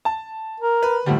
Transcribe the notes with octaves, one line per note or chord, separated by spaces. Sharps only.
A5
A#4
B4
A2 D3 F3 G3